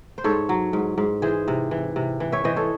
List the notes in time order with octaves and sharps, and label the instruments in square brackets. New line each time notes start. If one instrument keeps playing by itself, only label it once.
[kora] C5
G#2 A4 C#5
F#3
G#2
G#2
E3 G#4 C5
C3
E3
C3
E3
C#5 E5
E3 C5 D#5
A4 C#5